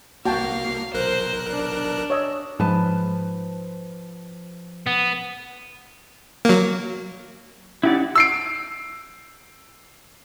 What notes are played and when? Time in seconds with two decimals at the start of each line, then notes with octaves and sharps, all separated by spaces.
0.25 C2 A#3 F#4 F5 G5 A5
0.94 B1 A#4 C5 F#6
1.51 D4
2.10 C#5 D#5 E6
2.60 G#2 F3 B4 A5
4.86 B3
6.45 F#3 A#3
7.83 C#4 D#4 E4 G4 D5 F#5
8.15 E6 C7 D7